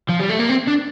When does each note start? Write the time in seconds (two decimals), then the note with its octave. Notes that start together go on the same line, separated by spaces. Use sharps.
0.09 F3
0.20 G3
0.30 A3
0.40 A#3
0.50 C4
0.68 D4